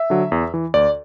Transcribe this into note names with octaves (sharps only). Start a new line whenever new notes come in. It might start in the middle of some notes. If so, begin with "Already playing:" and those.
Already playing: E5
D3 F#3
E2
E3
D2 D5